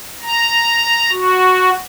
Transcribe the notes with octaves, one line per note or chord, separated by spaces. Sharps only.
A#5
F#4